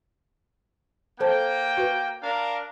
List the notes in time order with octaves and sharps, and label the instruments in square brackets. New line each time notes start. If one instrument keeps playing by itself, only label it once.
[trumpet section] A#3 G5 [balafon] A4 C5 A5
[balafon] F#4 B4
[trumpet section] D4 A#4 F5